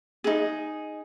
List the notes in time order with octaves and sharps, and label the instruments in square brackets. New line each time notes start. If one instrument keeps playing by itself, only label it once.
[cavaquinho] D#4 G#4